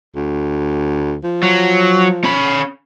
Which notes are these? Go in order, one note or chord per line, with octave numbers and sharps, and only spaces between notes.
D2
F3
F#3
C#4 B5